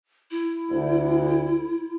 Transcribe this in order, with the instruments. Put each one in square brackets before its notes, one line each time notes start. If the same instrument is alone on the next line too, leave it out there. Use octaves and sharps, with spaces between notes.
[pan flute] E4
[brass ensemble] D2